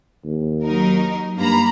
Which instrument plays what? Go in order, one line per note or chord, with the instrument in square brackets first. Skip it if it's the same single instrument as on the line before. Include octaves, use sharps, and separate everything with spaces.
[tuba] D#2
[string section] F#3 D#4 A#4
[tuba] G2 [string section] A#3 A#5 B5